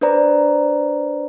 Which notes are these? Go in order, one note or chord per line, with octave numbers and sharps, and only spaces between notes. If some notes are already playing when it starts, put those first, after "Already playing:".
D4 B4 C5 D5 A#5